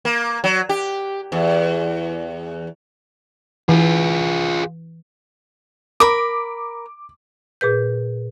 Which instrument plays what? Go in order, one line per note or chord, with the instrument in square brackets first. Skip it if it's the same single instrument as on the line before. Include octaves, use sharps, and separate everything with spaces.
[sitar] A#3
F#3
G4
E2
[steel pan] E3 [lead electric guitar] F4 G#4
[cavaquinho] A#4 B5 [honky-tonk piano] D6
[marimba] A#2 G#4 B4 G6